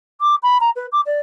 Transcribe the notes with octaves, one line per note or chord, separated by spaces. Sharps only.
D6
B5
A#5
B4
D6
D5